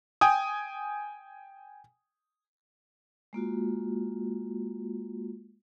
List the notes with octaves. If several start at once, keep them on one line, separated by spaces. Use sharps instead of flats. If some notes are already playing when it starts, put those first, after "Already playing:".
G5 G#5 D#6
G#3 A#3 F4 F#4